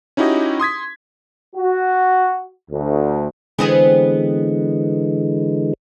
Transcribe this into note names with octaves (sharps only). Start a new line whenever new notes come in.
C#4 D#4 E4 F#4 G4 D#5
C6 D#6 G#6 B6
F#4
D2
D3 E3 G#3 B3 C4 G#4